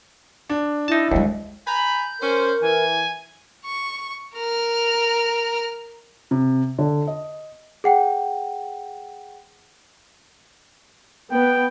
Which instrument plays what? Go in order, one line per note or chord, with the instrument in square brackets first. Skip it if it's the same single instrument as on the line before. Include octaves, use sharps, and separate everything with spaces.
[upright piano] D4
[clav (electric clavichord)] D#4 A5 [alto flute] E4
[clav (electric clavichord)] D#2 [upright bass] G3 G#3
[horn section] G#5 A#5 B5 [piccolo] G6
[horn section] C#4 C5 [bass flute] A#4
[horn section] E3 [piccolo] G#5
[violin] C#6
A#4 F6
[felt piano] C3
D3
D#5
[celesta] G#4 F#5 G5
[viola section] B3 [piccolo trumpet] G5